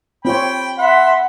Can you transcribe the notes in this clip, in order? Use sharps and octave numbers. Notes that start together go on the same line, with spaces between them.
C4 F4 C#5 G5 B5
E5 F#5 B5 C6